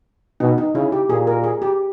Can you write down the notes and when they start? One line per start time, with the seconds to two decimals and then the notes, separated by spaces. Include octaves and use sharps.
0.40 B2 D#4
0.58 D#4
0.75 C#3 E4
0.92 G4
1.10 A#2 G#4
1.27 A#4
1.44 G#4
1.62 G4